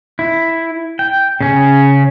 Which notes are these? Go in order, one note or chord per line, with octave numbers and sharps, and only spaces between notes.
E4
G5
C#3 C#4